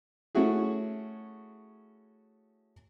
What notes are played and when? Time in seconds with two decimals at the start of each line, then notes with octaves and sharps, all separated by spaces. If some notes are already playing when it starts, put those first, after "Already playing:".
0.35 A3 C#4 E4 F#4 G#4